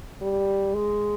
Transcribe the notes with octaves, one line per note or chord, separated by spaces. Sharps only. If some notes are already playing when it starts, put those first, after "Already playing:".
G3
G#3